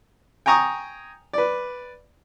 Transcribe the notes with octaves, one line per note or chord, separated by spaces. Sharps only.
G5 G#5 A#5 C#6 D#6
B4 D5